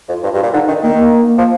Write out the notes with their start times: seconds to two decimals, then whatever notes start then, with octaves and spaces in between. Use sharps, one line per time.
0.08 F2
0.13 F4
0.23 G2 F4
0.33 G2 G4
0.38 F4
0.43 A#2
0.53 D3 D#4
0.68 D#3 D4
0.82 D#3 A#3
0.98 A#3
1.38 F3